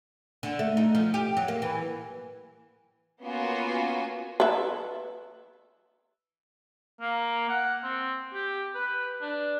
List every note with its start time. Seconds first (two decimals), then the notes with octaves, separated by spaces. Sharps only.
0.43 D3
0.59 A3
0.77 D#4
0.95 F3
1.14 G4
1.37 F#3
1.48 A#3
1.62 E3
3.23 A#3 B3 C#4 F4 F#4 G#5
4.40 B4 E5
7.01 A#3
7.49 F#5
7.83 C4
8.34 G4
8.75 B4
9.22 D4